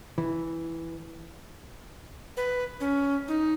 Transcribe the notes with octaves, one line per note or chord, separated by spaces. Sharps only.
E3
B4
C#4
D#4